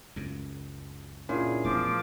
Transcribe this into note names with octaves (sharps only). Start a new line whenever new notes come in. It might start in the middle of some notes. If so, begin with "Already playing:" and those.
C#2 F#2 C#3
A#2 C#4 D4 E4 G#4
E1 F3 A3 B3 D6